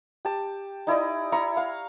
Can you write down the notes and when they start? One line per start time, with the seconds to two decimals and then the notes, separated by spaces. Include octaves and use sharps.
0.25 G4 A5
0.87 D#4 E4 D5 D#5
1.32 E4 A#5 C#6
1.57 F5